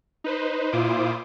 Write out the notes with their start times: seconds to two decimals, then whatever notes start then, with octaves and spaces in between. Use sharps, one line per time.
0.24 D#4 B4 C5
0.72 A#2 E4 F4 C5 D6 D#6